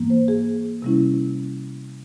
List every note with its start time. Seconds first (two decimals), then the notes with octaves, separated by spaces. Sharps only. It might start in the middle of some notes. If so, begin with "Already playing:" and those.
Already playing: G#2 E3 A#3
0.10 C5
0.28 G#4
0.82 C3 G3 C#4 E4